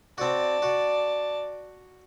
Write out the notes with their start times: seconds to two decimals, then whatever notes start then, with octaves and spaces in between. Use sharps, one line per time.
0.18 C4 F#4 D5 A5
0.62 F#4